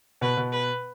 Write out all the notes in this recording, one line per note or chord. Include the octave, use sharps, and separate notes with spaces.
B2 B4
B2
B4